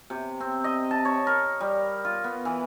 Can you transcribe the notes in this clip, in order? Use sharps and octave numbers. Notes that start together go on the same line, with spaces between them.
C3
C4
D#5
A5
C#5
A#4
G3
F4
B3
E3